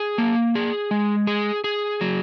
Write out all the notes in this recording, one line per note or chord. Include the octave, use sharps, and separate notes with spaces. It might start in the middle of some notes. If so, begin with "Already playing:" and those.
Already playing: G#4
A#3
G#4
G#3
G#4
G#4
F#3